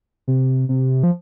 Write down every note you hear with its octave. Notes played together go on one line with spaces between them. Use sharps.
C3
C3
F3